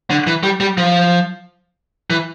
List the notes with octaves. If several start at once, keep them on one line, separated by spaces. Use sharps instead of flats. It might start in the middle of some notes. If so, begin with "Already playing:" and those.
D3
E3
G3
G3
F3
E3